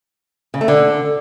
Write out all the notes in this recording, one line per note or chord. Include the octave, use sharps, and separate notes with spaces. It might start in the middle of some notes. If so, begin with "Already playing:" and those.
C#3
A3
D3